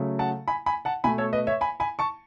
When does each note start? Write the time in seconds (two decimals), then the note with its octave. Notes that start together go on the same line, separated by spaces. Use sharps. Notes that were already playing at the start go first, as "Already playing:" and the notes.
Already playing: C#3 F#3 A3
0.19 F#5 A5
0.48 G#5 B5
0.66 G#5 B5
0.85 F#5 A5
1.04 B2 A3 G#5 B5
1.18 A4 C#5
1.33 B4 D#5
1.47 C#5 E5
1.61 G#5 B5
1.80 G#5 B5
1.99 A5 C#6